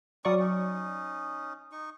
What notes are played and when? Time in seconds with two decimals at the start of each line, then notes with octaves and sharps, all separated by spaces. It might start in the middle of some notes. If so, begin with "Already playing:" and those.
0.25 F#3 G3 C#4 D5 C#6 D#6
0.40 C#4 D#4
1.72 D#4 C#6